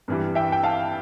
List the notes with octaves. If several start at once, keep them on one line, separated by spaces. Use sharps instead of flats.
G2 E3 G3
E5 G5
G5
F5 A5